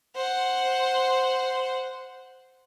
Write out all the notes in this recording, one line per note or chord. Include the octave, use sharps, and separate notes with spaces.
C5 F#5